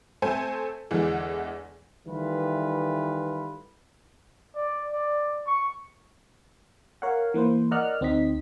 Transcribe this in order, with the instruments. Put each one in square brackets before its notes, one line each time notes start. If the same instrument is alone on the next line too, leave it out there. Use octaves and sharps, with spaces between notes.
[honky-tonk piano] A3 C4 A4 C5 G#5
E2 D3 E3 G#3
[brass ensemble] D#3 E3 G3 A3 F4 B4
[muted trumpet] D5
D5
C#6
[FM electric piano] A#4 C#5 F5 F#5
E3 A#3 B4 C5
A#4 D5 D#5 F#5 F6 F#6
D2 C4 D#4 D#5 B6